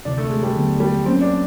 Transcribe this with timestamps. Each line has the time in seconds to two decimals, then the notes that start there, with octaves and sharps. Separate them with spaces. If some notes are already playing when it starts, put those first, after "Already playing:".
0.05 D2 C3 E3 D4
0.18 A3
0.30 G#3
0.43 G3
0.56 D#2 D3 F#3 B3
0.80 G3
1.05 F#3 A#3 C4 C#4
1.21 D4